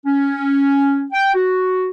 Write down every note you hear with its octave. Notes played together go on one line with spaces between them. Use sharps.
C#4
G5
F#4